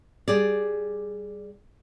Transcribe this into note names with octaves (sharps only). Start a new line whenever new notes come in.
G3 G#4 D5